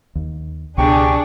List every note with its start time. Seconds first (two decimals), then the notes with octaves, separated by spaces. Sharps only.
0.15 D#2
0.78 C#2 B2 D4 G4 G#4 G5 C#6